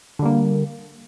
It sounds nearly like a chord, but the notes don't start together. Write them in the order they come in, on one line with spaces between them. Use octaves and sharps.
D3 G3 A#3